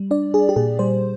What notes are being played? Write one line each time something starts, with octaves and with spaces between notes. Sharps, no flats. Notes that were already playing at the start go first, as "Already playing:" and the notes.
Already playing: G3
D4 D5
D4 G#4
G4
A#2 G#4
G3 C5